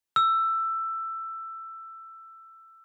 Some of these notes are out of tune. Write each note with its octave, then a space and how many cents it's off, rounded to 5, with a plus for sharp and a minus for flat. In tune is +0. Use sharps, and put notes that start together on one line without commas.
E6 +15